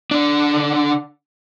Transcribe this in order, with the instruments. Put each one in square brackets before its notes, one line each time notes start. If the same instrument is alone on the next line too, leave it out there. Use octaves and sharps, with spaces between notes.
[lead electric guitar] D3 D4